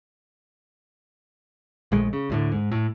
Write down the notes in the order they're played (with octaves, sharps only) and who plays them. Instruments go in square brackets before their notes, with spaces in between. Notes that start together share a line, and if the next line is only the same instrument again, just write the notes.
[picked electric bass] A#1 D#3 G#3 A3
C#3
D2 A2 D3
G#2
A2